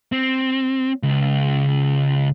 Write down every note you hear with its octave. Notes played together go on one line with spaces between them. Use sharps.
C4
C#2